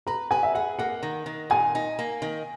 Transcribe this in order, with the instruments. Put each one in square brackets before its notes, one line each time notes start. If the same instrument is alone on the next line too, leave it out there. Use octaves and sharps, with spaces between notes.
[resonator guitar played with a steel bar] B4 [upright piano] A#5
[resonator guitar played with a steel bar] B4 [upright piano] G#5
[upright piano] E5
[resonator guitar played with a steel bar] G#4 [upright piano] F#5
[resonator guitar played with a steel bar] A#3 [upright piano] F#5
[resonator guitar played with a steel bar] D#3
D#3
[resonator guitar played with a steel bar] A#2 [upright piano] G#5
[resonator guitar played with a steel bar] D#4
A#3
D#3